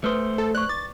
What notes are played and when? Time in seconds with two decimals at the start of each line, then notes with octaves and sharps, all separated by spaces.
0.04 A3 B4 C5 D#6
0.38 A4
0.55 D5 C#6 F#6
0.69 D6 A6